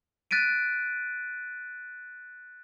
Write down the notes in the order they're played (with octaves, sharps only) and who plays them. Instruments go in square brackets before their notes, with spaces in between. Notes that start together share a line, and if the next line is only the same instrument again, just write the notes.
[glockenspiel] F#6 A6 B6 D7 D#7